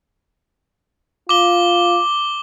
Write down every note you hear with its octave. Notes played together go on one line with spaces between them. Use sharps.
F4 D6 G7